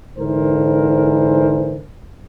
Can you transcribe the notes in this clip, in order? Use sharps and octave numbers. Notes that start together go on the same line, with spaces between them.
G#2 D3 E3 A#4 C5